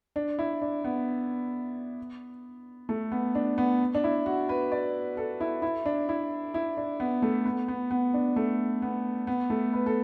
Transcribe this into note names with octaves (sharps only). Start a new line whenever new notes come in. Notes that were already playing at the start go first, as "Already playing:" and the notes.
D4
E4
D4
B3
A3
B3
D4
B3
D4
E4
F#4
B4
D5
A4
E4
E4
D4
E4
E4
D4
B3
A3
B3
B3
B3
D4
A3
B3
B3
A3
B4
A4